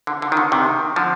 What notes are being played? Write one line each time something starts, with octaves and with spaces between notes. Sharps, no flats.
D3
D3
D#3
D3
C3 D#3
D3 F3